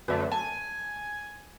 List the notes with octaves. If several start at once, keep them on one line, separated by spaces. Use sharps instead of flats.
F#2 D3 A3 B4 E5
G#5 A5